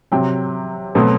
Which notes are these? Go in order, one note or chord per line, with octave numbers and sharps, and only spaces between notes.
C3 F#3 C4 G5
B2 F#3 A3 C4